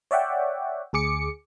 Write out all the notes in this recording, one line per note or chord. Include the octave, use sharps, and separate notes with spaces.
C#5 D5 E5 F#5 G5
D2 G#4 D6 C#7